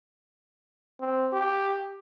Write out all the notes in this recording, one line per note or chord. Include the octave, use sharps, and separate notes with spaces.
C4
G4